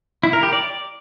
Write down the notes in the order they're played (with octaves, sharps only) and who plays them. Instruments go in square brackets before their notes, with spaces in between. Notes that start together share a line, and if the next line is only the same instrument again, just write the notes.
[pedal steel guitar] E4
A#4
G4
D5